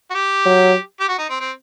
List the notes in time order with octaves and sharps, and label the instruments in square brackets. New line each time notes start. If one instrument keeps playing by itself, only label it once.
[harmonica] F#4
G4
[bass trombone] F#3
[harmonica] G4
F#4
D#4
C4
C4